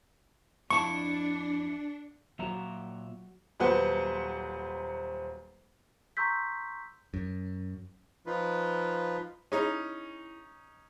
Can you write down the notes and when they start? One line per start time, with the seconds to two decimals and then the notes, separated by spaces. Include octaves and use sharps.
0.70 F2 D4 E4 A5 C#6 C#7
2.39 A#2 F#3 F#4 E5 A#5
3.60 D#1 F#3 B4 C5 F#5 C6
6.17 A#5 C6 C#6 E6 G6 B6
7.14 F#2
8.26 F3 D#4 F4 B4
9.52 C#4 D#4 E4 G#4